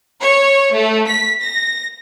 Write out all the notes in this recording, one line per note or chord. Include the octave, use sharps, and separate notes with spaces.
C#5
A3
B6
A#6